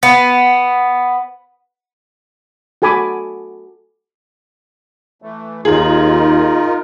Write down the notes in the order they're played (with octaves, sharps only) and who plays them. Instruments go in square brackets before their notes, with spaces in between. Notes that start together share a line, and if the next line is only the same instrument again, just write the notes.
[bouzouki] B3
[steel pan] F#4 A4 G#5 B5 D6
[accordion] E3 A3
[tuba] D#2 [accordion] D#4 F4 A#4 [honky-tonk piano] G#4